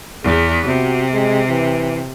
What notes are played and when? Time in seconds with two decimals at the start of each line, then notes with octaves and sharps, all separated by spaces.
0.23 E2 B3 G#4
0.65 C3 F#4
1.13 G#3
1.49 E3